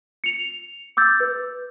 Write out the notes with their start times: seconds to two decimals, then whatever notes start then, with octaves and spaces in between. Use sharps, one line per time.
0.24 C#7 F7
0.97 D6 E6 G6 A6
1.20 B4